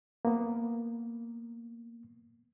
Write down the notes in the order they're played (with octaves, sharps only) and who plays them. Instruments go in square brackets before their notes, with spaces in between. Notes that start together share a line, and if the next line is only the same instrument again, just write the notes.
[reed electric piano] A#3 B3